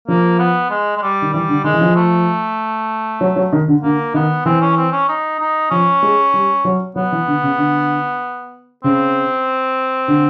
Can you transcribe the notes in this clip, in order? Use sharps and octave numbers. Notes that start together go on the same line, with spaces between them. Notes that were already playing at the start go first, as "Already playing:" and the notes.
F3 A#3
B3
G#3
G#3
G3
D#3
E3 G3
D3
D#3 G#3
E3
F3
A3
F#3
F#3
D#3
D3
D3 A#3
D#3 B3
E3 C4
C#4
C4
C#4
D#4
D#4
F3 C#4
G#3
G3
F#3
F#3 B3
E3
D3
C#3
D3
C#3 C4
D3